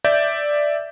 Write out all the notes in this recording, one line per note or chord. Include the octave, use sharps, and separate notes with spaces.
D5 E5 G6